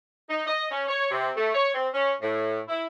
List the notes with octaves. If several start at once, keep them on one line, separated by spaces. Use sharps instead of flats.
D#4
D#5
C#4
C#5
C3
A3
C#5
C4
C#4
A2
E4